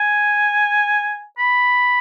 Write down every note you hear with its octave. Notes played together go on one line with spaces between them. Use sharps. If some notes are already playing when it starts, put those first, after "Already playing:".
Already playing: G#5
B5